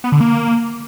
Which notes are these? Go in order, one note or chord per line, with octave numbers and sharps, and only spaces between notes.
B3
D3
A#3